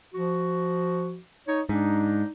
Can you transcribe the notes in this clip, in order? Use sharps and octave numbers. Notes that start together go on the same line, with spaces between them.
F3 F#4
D#4 C#5
G#2 D4 D#4